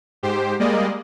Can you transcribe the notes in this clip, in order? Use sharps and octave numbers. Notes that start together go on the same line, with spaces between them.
G#2 G4 C5
G3 G#3 A#3 D5 D#5